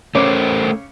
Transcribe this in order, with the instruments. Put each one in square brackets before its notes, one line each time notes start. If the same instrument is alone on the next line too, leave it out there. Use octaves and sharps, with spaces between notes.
[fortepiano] C#3 C#5 D6 [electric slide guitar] A3 A#4 C5